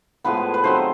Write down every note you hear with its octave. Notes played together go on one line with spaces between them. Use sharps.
A2 F3 G#3 B3 B4
B4
D#3 F#3 A3 C4 C5